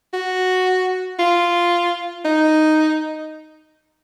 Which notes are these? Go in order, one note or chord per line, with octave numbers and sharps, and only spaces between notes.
F#4
F4
D#4